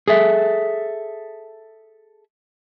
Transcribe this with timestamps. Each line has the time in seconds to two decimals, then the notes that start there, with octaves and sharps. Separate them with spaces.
0.08 G#4 A4 E5